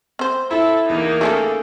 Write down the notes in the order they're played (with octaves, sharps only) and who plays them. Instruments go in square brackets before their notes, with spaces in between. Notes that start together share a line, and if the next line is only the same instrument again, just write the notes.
[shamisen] C4 C5
[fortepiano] E4 [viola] A4
[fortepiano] E2 [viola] A#3 D#4
[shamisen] C#3 G#3 A3 [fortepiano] G#4 A4